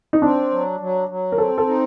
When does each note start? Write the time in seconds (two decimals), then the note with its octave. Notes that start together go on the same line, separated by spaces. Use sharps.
0.13 D#4
0.22 C4 D4
0.51 F#3
0.80 F#3
1.09 F#3
1.32 A#4
1.38 C4 A4
1.58 A4
1.67 D#4